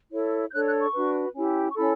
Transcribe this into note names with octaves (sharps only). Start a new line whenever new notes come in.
E4 A4 C#5
G6
D4 A4 C#5 F#6
F#6
C#6
D4 F#4 B4
C#4 E4 G4
C#6
C#4 E4 A4 B5